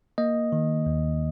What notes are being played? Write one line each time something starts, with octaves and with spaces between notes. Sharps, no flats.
A#3 D#5
D#3
D#2